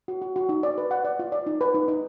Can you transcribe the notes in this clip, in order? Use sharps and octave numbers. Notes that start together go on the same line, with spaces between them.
F#4
F#4
F#4
D#4
D5
B4
F#5
D5
F4
D5
D#4
B4
D#4
D#4